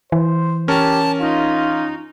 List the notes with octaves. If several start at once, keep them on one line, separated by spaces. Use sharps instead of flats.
E3 C5
C#4 G4 A#4 A5
D#4 F4